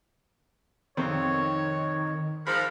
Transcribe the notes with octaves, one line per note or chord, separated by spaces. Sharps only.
F2 C3 D#3 C4 C#5
G#2 F3 A#4 B5